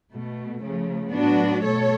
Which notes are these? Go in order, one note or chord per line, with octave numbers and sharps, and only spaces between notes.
B2 A3
C#3 F3 A3
A2 F#3 B3 D4 F#4
B2 A3 A4 C#5